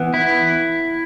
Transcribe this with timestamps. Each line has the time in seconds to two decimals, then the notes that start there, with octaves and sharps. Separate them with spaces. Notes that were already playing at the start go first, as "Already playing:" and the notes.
Already playing: E3 B3
0.14 E4